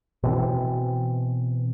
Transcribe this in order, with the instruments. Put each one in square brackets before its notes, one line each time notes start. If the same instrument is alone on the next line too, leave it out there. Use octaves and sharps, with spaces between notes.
[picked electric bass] B2 E3 C4